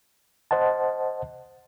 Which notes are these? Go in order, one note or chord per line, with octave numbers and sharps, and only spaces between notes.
C5 D#5 F#5 A5